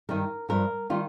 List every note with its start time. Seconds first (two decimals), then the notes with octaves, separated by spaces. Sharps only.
0.09 G2 D#3 G3 A#4
0.49 G2 F3 A#4
0.90 D#3 G3 F4